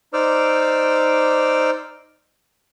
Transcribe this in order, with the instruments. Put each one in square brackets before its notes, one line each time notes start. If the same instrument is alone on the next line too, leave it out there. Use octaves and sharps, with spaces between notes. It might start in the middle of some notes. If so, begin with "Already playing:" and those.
[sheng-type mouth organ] D#4 C5 D5 D6 E6 F6